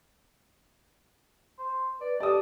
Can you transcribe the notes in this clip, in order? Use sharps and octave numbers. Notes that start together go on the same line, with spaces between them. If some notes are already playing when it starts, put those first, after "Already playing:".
C5
B4 D5
G4 A4 D5 D#6